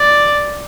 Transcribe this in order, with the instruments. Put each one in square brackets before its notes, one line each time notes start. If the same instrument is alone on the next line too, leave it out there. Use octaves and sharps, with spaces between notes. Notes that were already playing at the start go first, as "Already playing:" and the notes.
Already playing: [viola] D5